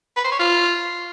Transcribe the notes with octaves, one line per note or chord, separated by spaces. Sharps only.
B4
C5
C#5
F4